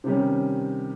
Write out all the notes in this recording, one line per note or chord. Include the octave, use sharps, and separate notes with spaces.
C3 D#3 G3 C#4